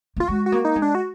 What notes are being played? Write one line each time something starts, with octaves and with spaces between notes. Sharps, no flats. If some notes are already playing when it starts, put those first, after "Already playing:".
A#3 F4
G#3 F#4
F#4
A#3
D#4
G#3
D4
F#4